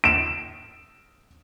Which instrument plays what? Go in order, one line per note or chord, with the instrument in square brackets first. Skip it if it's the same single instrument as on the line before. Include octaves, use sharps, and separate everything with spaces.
[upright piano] D7 E7